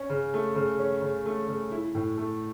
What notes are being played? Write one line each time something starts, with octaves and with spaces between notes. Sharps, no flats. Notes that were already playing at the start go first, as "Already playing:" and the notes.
Already playing: C#4
C#3
A3
C#3
C#4
C#3
A3
C#3
E4
A2
A3